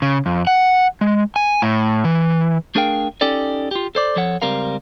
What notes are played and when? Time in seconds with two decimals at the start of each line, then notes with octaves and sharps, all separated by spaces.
0.02 C#3
0.26 F2
0.47 F#5
1.01 G#3
1.36 G#5
1.62 A2
2.04 E3
2.75 A3 D4 G#4 A#4 F5 G5
3.21 C#4 D#4 G4 A4 D5
3.71 F4 G4
3.95 A4 C5 D5
4.16 F2 F3 A4 C#5 F#5
4.42 C#2 G3 C4 A#4 F5